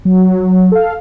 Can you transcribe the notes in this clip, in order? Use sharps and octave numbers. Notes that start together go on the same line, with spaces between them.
F#3
A4 F5